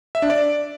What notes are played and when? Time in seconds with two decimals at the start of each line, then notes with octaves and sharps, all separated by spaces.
0.15 E5
0.22 D4
0.30 D5